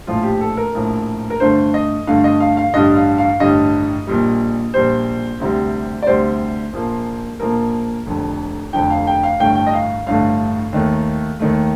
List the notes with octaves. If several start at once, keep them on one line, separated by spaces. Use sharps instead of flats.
A#1 A2 F3 F4
G4
A4
A#4
A#1 A2 F3
A#4
G2 D3 A3 C5
D#5
G2 D3 A3 F5
D#5
F5
F5
A1 G2 D3 G3 D#5
F5
F5
A1 G2 D3 G3 D#5
A#1 A#2 G3
A#1 A#2 G3 C5
D2 C3 G3
D5
D2 C3 G3 C5
A#1 A#2 F3 A#3
A#1 A#2 F3 A#3 A#4
F1 F2 D3
F1 F2 D3 G5
F5
G5
F5
A1 G2 D3 A3 G5
G5
D#5
F5
A1 G2 D3 A3 F5
D#2 D#3 A3
D#2 D#3 A3